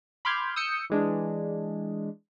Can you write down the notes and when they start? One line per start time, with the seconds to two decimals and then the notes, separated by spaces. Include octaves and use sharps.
0.25 B5 C6 D6 F6 G6 G#6
0.56 D#6 E6 G6 C#7
0.90 E3 G#3 D4